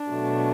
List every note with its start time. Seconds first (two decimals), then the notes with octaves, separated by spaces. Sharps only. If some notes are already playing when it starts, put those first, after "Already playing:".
Already playing: D4
0.10 B2 F#3 A3